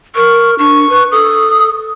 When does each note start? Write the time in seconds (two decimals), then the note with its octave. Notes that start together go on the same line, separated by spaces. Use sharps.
0.15 A#4 C#6
0.59 D4 C#6
0.89 B4
1.12 A4 D#6